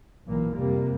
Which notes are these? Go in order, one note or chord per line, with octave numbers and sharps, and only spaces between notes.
B1 A#2 E3 A#3
F2 C3 G3 A#3